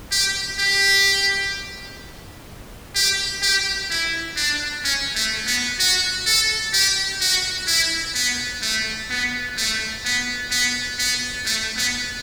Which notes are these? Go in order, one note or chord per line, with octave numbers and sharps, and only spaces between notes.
G4
G4
G4
G4
E4
D4
C#4
A3
B3
F#4
A4
G4
F#4
E4
B3
A3
B3
A3
B3
B3
B3
A3
B3